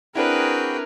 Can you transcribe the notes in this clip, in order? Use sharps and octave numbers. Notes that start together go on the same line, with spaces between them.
C4 D4 E4 F#4 G#4 A#4 B4 G5